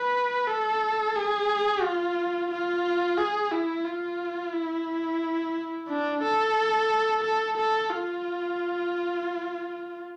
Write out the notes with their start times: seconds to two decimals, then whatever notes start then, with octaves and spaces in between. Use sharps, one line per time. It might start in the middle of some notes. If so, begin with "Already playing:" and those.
Already playing: B4
0.47 A4
1.16 G#4
1.83 F4
2.51 F4
3.18 G#4
3.52 E4
3.85 F4
4.53 E4
5.88 D4
6.22 A4
7.24 A4
7.57 A4
7.91 F4